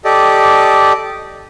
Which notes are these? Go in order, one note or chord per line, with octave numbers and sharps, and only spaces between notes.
G4 A4 D5 D#5